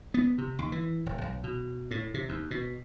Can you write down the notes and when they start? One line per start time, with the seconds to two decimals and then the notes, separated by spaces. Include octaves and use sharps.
0.14 B3
0.38 C3
0.59 D#2
0.72 E3
1.06 D#1
1.21 B1
1.44 B2
1.91 A2
2.14 C3
2.29 D#2
2.51 B2